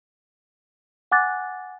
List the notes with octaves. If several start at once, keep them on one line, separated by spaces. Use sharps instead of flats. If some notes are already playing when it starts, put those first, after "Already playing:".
F#5 G#5 D6 F#6 A6